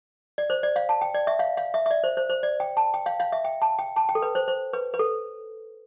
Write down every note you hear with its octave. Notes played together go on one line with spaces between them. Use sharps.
D5
C5
D5
F5
A5
G5
D5
E5
F5
F5
E5
E5
D5
C5
C5
C5
D5
G5
A5
G5
F5
F5
E5
G5
A5
G5
A5
G5
A4
B4
C5
C5
B4
B4
A4